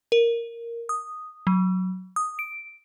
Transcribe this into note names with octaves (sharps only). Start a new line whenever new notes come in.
A#4
D#6
F#3
D#6
D7